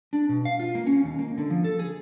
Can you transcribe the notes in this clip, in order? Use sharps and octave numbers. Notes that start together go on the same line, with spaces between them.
D4
B2
F5
F4
A#3
C#4
D#2
A#3
D3
F3
A4
G#4